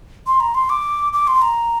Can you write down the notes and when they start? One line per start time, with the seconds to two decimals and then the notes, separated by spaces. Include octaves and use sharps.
0.27 C6
0.40 A#5
0.55 C6
0.70 D6
1.13 D6
1.27 C6
1.42 A#5